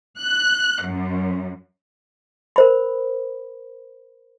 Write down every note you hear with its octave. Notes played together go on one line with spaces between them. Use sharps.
F#6
F#2
A#4 C5 B5